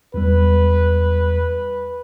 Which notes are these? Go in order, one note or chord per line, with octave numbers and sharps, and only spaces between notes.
E2 G3 B4